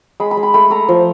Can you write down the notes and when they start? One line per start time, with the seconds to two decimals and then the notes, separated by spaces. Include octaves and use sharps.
0.20 G#3 B5
0.31 B5
0.37 G#3
0.43 B5
0.54 A3 B5
0.70 A3 A#5
0.88 F3